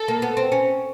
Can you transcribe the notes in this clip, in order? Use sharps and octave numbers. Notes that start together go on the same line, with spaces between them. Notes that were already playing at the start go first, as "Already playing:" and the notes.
Already playing: A4
A#3
B3
C4
C#4